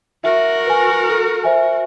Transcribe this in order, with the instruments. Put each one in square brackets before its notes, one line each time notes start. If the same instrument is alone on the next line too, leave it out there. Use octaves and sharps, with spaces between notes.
[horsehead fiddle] F#4 A#4 [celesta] E5
[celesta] B4 G#5
A4
C5 E5 G#5